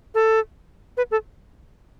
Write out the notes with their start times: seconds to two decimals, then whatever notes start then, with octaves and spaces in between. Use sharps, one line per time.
0.15 A4
0.97 B4
1.11 A4